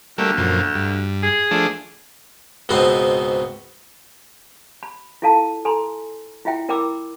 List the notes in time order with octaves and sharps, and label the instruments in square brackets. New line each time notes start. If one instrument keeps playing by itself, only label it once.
[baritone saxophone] D2 [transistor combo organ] G3 A3 A#3
[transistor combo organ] F#2 A#2 F3
G2
[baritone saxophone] G#4
[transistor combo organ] F3 A3 D4
[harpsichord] C#2 G#2 B2 B3 C4
[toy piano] B5
E4 F4 A4 F5 A5
A4 G#5 A#5 C6
E4 F4 E5 G5
E4 A#4 G5 B5 D6 E6